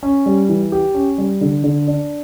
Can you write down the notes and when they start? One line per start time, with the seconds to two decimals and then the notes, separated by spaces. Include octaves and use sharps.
0.03 C#4
0.26 G3
0.49 E3
0.72 G4
0.94 C#4
1.18 G3
1.41 D3
1.64 D3
1.88 D4